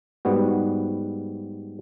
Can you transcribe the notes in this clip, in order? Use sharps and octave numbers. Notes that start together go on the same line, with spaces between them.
G#2 G3 B3 F#4